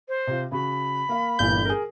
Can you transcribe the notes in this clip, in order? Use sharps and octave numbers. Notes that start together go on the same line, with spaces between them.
C5
C3 F4
C#3 F#4 B5
A#3 F5
G1 A#2 E3 A3 G6
G#4 A#4